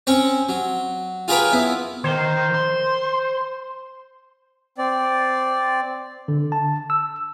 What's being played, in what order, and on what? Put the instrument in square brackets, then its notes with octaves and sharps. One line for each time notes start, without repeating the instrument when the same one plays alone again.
[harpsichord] C4 C#4 C#6
F#3
F4 G#4 A#4 B4 C#5 G5
B3 E4
[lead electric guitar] D#3 A#4 [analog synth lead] C5
[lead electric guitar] C6
[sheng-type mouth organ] C4 D5
[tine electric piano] D3
A5
E6